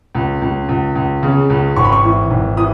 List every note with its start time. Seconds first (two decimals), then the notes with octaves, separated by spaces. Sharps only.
0.15 C#2
0.42 C#2
0.69 C#2
0.95 C#2
1.23 C#3
1.50 C#2
1.76 G#1 C#6
1.84 B5
1.92 C#6
2.04 E3
2.30 G#1
2.57 E3 D#6